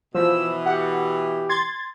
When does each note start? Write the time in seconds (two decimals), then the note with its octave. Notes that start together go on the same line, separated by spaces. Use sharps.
0.14 B2 E3 F3 E6
0.66 G4 F#5
1.49 C6 G#6 A6